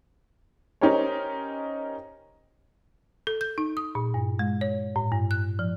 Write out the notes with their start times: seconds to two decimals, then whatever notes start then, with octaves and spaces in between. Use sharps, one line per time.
0.81 C#4 D#4 G4 A#4 C5 C#5
3.27 A4
3.41 G6
3.58 D#4
3.77 D#6
3.95 A#2
4.14 G2
4.39 G#3
4.61 C#5
4.96 A2
5.12 G2
5.31 F#6
5.59 F3